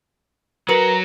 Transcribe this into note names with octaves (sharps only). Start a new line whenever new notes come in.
F#3 F#4 A#4 B4 A#5 F#7